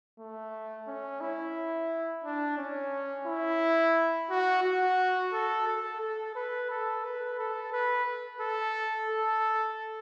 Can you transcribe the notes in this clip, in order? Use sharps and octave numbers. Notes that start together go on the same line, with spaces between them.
A3
C#4
E4
D4
C#4
E4
F#4
F#4
A4
A4
A4
B4
A4
B4
A4
B4
A4
A4